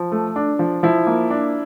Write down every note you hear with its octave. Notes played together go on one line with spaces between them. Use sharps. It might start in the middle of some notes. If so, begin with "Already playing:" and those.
Already playing: F3
A3
D4
F3
F3 E4
A#3
D4